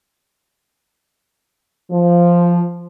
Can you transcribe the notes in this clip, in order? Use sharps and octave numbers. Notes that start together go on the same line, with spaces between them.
F3